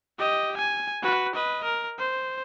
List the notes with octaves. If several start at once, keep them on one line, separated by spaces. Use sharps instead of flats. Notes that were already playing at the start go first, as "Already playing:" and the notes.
G4 D#5
G#5
F#4 B4
B4 D#5
A#4
C5